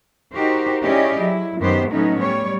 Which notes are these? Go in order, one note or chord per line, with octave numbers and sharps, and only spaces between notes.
D#4 F#4 G4 A#4 C5
C#4 E4 G4 G#4 D5 D#5
F#3 E4
F#2 D#3 F#3 B3 G4 C5
A2 F#3 A3 B3 C#4 D#4
F#3 G3 C#5